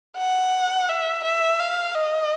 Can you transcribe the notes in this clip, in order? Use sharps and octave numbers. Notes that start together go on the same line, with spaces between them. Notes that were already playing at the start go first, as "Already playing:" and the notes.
F#5
E5
E5
F5
D#5